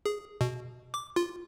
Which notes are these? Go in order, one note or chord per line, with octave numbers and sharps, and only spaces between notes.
G#4
B2
D6
F4